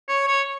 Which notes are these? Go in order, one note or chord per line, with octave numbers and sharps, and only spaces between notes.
C#5
C#5